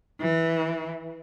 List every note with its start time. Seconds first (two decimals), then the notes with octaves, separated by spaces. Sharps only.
0.21 E3